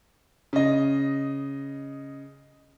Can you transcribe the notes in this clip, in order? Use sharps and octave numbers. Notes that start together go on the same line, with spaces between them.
C#3 D#5